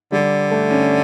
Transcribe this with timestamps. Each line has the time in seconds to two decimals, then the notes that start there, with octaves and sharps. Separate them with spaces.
0.12 D3 G3
0.51 A3
0.71 C#4